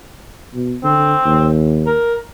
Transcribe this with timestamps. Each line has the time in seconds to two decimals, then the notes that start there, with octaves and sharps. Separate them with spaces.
0.54 B2
0.84 D3 C4
1.24 D#2
1.86 A#4